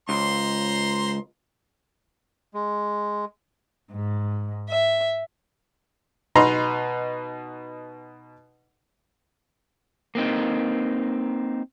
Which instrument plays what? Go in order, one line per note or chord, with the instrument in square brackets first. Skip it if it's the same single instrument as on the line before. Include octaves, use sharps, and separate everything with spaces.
[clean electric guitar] C#2 [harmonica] C5 A#5 C6
[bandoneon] G#3
[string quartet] G#2
E5
[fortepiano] B2 D#4 B4 A#5 C6
[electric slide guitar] A#3 C4 D#4